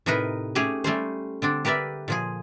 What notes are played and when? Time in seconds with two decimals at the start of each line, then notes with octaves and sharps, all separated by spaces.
0.06 A2 C3 D#4 A#4 B4
0.55 A3 C#4 G4 G#4
0.84 G3 A3 C#4 C5
1.42 D3 C4 D4
1.65 G4 A#4 B4 D5 E5
2.08 A#2 F3 G#4